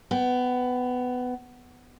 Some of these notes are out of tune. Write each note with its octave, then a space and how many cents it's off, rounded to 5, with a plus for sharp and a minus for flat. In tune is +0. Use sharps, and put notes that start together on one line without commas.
B3 +15 G5 +5